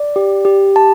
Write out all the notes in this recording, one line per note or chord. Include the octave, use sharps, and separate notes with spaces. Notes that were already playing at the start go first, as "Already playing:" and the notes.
Already playing: D5
G4
G4
A5